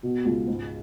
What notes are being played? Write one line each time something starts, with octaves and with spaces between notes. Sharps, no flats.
B2
C#2
G#2